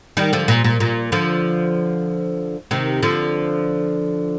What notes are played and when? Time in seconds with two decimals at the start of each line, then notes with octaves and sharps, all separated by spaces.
0.17 D#3 G3
0.33 D3 F3
0.48 A#2
0.64 A#2
0.80 A#2
1.12 D3 F3
2.71 C3 D#3
3.03 D3 F3